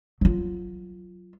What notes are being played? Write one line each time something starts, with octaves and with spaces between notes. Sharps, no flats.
F#3 F4